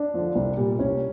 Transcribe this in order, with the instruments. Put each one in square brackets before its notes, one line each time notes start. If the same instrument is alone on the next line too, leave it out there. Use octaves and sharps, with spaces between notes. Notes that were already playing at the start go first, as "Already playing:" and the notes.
Already playing: [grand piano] D4
D3 F3
C2
A#2 G3
C2 C#4